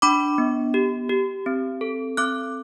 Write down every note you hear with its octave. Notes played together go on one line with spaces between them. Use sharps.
D4 B5 D6
B3
G4
G4
C4
A4
C4 D6 F#6